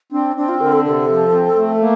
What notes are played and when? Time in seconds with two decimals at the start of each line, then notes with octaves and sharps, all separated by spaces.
0.12 C4 D4
0.36 C4 D4
0.49 F4
0.60 D3 A#4
0.72 A4
0.84 C3 A4
1.08 F3
1.32 C4
1.56 A3
1.80 A#3